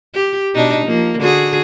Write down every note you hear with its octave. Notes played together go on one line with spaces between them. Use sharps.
G4
B2 D4 D#4
F3 A#3
D3 F#4 G#4